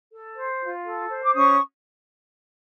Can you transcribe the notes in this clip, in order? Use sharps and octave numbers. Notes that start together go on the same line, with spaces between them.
A4
C5
F4
A4
C5
D6
C#4 C#6 D#6